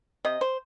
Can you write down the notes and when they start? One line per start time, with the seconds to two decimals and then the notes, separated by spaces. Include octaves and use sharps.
0.25 C3 D#5
0.41 C5